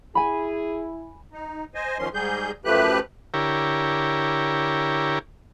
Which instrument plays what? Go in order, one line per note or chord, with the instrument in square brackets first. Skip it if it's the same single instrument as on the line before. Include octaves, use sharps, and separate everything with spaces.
[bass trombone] E4 [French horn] G#4 [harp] G#5 B5
[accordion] D#4
C5 D#5 G#5
F2 D#3 F3 C#4 C6
G#2 G3 G#4 G6
F#2 F3 A3 G4 B4 F#6
[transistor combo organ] D3 E4 G4 A#4 C#5